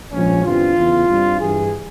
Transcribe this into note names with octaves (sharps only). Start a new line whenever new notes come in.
A#1 G#2 F3 C#4
G1 G2 E3 G3 C4 F4
E2 C#3 E3
G2 G3 C4
G2 E3 G3 G#4